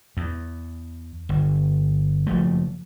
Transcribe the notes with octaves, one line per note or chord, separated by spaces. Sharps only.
E2
G1
F#1 F3 A3